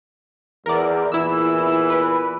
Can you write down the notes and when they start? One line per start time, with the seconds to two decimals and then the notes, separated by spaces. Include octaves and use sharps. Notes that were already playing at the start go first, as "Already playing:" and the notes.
0.66 E2 A#4 D5
1.12 E2 A#2 E3 E4 E6
1.90 B4